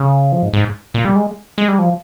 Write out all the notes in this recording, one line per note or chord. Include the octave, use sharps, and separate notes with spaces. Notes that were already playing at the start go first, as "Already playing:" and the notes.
Already playing: C#3
F3
G#2
G#2
A#2
G3
G#3
G#3
G3
F3